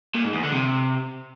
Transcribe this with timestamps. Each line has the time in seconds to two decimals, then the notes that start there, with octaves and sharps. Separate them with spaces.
0.15 A#2
0.24 G#2
0.34 E2
0.43 D3
0.53 C3